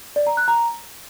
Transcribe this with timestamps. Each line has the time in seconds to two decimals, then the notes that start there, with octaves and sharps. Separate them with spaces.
0.16 D5
0.27 A#5
0.37 F#6
0.48 A#5